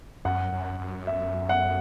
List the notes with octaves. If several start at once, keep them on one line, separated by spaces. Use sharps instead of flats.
F#2 F#5
F#2
F#2
E5
F#5